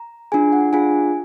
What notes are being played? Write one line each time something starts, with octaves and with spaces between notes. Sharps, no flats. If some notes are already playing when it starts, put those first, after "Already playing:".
Already playing: A#5
D4 F4 G#4 G#5
F#5
D4 F4 G#4 G#5